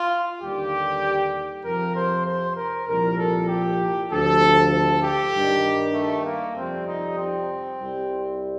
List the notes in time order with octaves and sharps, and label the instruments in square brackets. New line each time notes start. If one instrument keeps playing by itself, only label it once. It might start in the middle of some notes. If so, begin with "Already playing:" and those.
Already playing: [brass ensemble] F4
D#2 D3 G3 G4
F2 C3 F3 A#4
C5
C5
A#4
C2 A#2 F3 A#4
A4
G4
D2 C3 F3 A4
A4
G4
G2 D#3 G3
A3
A#3
F2 C3 G3 C4
D#4
C4
C2 C3 G3